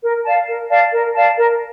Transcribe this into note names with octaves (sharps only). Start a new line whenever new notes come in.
A#4
D5 F5 A5
A#4
D5 F5 A5
A#4
D5 F5 A5
A#4